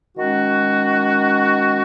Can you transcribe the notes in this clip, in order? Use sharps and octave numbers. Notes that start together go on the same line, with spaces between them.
D#3 G#3 C#4 F#4